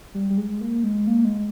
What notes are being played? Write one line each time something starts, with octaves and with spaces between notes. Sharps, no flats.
G3
G3
G#3
A#3
G#3
A#3
G#3